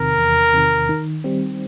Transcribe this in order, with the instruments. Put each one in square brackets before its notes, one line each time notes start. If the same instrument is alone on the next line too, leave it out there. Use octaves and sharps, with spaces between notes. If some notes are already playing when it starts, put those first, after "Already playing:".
Already playing: [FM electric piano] E2 C3 D#3 [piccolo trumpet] A#4
[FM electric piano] E2
C3 D#3
D#3
G3 C4